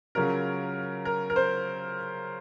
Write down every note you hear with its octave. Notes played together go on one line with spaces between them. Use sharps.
C#3 F#3 C#4 F4 A#4
A#4
A#4
C5